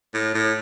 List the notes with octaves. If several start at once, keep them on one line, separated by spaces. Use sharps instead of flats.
A2
A2